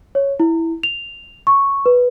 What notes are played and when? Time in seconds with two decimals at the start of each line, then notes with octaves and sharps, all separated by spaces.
0.15 C#5
0.40 E4
0.83 F7
1.47 C#6
1.86 B4